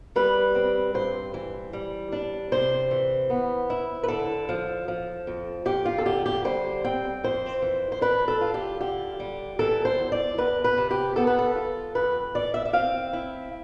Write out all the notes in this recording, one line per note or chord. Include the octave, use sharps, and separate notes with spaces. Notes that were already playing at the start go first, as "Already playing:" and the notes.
G3 B4
C4
G2 C5
E3
G3
D4
C3 C5
E3
B3
E4
B4
D3 A4
F3
F3
F2
F2 G4
F4
A4
D3 G4
G4
G3 C5
C4 G5
F2 C5
E3
C5
D4 B4
A4
F4
G4
D3 G4
G3
E3 A4
C5
E2
D5
E2 B4
B4
C3
G4
B3 A4
B4
A4
F4
F2 B4
E3 D5
E5
E5
C4 F5
E4